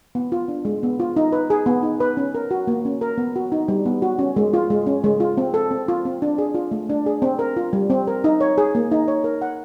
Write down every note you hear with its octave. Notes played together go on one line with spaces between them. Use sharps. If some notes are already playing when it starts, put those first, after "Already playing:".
B3
F4
D4
G#3
B3
F4
D#4
B4
G#4
B3
D#4
B4
C#4
A#4
F#4
A#3
C#4
A#4
B3
F#4
D#4
G3
B3
F#4
C#4
G#3
F4
G#3
C#4
G#3
F4
C4
A4
C4
F4
C4
D4
G#4
F4
A3
D4
G#4
C4
A#4
F4
G3
C4
A#4
D#4
C#5
G#4
A#3
D#4
C#5
A#4
F#5